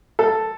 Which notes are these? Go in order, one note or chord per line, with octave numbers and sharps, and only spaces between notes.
A4